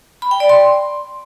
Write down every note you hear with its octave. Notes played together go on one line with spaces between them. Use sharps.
B5
G5
D5
C6